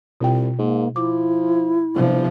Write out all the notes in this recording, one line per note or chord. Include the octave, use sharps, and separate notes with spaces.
C2 B2 F4 G5
G#2 A#3
F3 E4 D6
G1 C3 F3